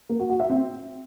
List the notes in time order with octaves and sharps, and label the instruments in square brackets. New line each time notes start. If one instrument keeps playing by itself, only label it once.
[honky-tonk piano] A#3
F#4
F#4
E5
C4